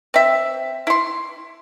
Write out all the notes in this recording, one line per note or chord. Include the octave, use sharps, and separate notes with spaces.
C4 E5
E4 C6